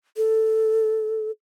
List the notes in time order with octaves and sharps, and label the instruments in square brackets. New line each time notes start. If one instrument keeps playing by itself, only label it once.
[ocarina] A4